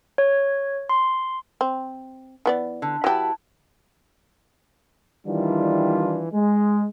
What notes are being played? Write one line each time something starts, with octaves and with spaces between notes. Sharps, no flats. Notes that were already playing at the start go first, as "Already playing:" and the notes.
C#5
C6
C4
E3 B3 D5
D3
F#3 E4 G4 B4 A5
D#3 E3 G3 D4 E4 F4
G#3